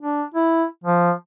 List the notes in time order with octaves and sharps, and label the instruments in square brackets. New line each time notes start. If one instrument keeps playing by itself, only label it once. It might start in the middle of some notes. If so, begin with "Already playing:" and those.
[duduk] D4
E4
F3